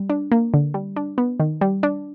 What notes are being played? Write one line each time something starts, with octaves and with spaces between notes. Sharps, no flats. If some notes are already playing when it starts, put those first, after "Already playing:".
Already playing: G3
D4
A#3
D3
G3
D4
B3
D#3
G3
D4